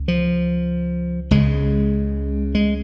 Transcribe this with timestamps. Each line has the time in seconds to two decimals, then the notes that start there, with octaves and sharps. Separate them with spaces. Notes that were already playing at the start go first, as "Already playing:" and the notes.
Already playing: C#2
0.08 F3
1.31 C#2 C#3 G#3
2.55 G#3